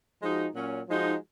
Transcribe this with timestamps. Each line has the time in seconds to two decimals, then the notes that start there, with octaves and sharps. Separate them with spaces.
0.21 F3 G#3 D#4 F#4
0.54 A#2 F#3 C#4
0.88 F3 G#3 D#4 F#4